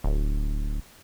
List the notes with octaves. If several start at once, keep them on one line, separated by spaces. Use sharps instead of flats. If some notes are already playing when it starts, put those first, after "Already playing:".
D1